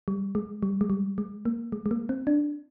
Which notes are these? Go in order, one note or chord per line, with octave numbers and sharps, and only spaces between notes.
G3
G#3
G3
G#3
G3
G#3
A#3
G#3
G#3
A#3
C4
D4